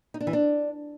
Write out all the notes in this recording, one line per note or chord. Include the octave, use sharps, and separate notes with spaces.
D#4
D4
E3
D4